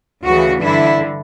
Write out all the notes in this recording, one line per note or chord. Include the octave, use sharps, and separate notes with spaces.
D2 C#3 E3 F#4
G2 D3 E4